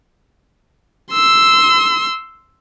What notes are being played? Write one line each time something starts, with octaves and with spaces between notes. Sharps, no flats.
C6 E6